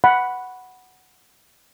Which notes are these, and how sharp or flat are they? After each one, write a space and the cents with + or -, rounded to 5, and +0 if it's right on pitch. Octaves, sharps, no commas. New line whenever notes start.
F#5 +0 B5 +0